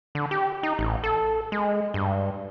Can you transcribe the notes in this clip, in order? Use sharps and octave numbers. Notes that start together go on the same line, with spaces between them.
D3
G4
D#4
A1
A4
G#3
G2